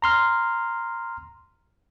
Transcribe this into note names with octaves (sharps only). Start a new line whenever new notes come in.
A#5 C6 F6